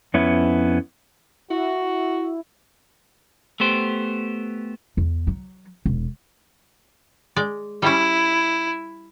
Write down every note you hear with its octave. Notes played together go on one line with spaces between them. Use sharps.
F2 B3 C#4 E4
E4 F#4
A3 B3 G4 C5
E2
F#3
E1
G#3 D5
G3 C#4 E4